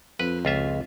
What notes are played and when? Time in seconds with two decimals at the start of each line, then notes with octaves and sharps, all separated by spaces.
0.20 F2 B4
0.45 C#2 F4 E5